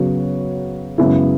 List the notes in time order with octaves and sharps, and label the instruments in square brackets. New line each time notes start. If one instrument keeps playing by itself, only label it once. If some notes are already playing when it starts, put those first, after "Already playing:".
Already playing: [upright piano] C#3 F#3 B3 F#4 C#5
F#2 C#3 G#3 B3 E4